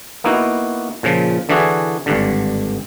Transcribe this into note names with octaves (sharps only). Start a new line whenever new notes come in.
A#3 B3 D#4 E4 F#4
A#2 C#3 F3
D3 E3 D4 E4 F#4 G#4
G#1 G2 D3